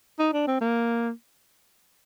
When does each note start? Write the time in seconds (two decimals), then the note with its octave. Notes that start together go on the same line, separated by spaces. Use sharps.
0.19 D#4
0.33 D4
0.47 C4
0.61 A#3